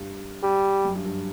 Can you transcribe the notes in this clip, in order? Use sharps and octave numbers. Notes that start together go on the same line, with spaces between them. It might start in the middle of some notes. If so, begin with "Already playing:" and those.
Already playing: G2
G3
F#2
G2
G2